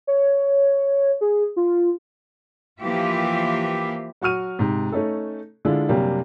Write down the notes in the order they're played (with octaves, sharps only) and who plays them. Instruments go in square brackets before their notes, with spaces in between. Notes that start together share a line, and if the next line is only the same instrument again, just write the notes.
[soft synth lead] C#5
G#4
F4
[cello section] E3 F3 A#3 F4 G4 E5
[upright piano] F#3 F#4 C#6 F6 D#7
G#2 C3
A3 C#4 D#4 A4
D3 G#3 D4 E4 F4 A4
F#2 C3 G3 A#3 D4